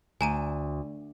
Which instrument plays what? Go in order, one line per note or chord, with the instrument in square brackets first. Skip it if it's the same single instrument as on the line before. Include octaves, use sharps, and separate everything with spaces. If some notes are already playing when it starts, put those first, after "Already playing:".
[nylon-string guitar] D2 [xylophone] G#5 A#5 D#7